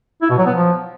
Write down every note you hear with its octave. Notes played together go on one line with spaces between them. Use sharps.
E4
B2
F#3
B3
F3